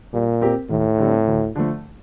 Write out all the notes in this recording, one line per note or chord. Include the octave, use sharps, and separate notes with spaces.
A#2 G3
C4 G4 A#4
D#2 A2
D3 G3 C4
D2
D3 F3 A3